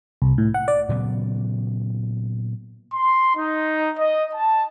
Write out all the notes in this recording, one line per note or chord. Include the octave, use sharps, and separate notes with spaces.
C2
A2
F#5
D5
A#2 C#3 F#3 B3
C6
D#4
D#5
A5